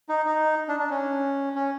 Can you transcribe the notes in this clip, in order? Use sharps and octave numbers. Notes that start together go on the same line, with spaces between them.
D#4
D#4
D4
D4
C#4
C#4